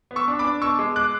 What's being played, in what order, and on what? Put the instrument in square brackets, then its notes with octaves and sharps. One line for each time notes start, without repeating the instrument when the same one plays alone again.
[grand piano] B3
C#6 E6
D4
B5 D6
D4
B2 C#6 E6
G#3
D6 F#6